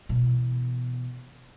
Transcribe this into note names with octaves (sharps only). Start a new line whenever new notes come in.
B2 E3